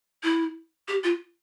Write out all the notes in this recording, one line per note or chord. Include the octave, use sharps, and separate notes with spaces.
E4
G4
F4